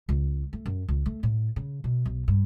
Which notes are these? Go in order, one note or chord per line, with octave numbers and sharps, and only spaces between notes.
C#2
A3
F#2
C#2
A3
A2
C#3
B2
B1
G2